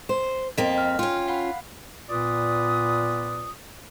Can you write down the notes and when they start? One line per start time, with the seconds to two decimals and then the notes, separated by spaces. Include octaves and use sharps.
0.09 C5
0.58 F2 A#3 C4 D#5 B6
0.78 F6
0.99 C#4 F4 G5
1.28 F5 F#5 B5
2.09 A#2 B3 F4 B4 D5 D#6